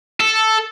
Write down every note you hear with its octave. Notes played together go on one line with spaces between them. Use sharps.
A4